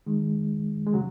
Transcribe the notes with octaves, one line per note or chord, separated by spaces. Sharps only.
D#3 G#3
G#3
C#3 F#3